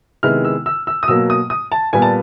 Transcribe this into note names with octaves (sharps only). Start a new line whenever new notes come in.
C3 D#3 G#3 B3 E4 F6
E6
E6
E6
D#6
B2 F#3 A#3 E6
D#6
D#6
A5
A#2 G3 B3 G#5
A5